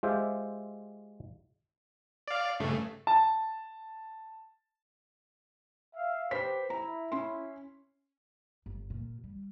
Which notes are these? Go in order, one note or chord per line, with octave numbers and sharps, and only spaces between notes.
G#3 F4 G4 C5 E5 G5
D5 F5
G2 C#3 A3
A5
E5 F5
G4 B4 C5 B6
E4 A#5
C#4 C6
G1
A#2
G3